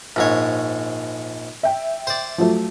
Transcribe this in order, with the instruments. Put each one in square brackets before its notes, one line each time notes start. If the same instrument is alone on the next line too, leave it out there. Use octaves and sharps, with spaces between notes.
[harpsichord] A#1 G#2 C#5
[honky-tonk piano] E5 G5
[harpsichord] C5 D5
[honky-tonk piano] F3 F#3 A3